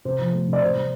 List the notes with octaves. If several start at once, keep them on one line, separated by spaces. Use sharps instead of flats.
C3 C5
F3
A3
C3
D5
C3 C5
G3